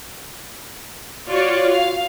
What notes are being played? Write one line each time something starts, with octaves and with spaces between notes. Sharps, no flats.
F4 F#4 C#5 D5
F5